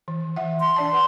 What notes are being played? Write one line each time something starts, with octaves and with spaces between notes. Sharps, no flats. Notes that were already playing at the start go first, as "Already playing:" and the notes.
E3
E3 E5 F#5
C6
D4 D5 A5
B4 F#5